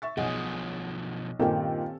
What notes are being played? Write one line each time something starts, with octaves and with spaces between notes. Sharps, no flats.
E5 C#6 A6
B1 B2 F3 G#4 D#5 F#5
G2 A#2 D#3 C4 C#4 G4 A4